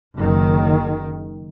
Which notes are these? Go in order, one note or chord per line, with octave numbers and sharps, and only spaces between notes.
F#1 D#3